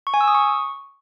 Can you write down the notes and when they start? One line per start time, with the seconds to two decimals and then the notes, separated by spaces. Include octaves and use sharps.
0.07 C#6
0.14 G#5
0.21 E6
0.28 D#6
0.35 C#6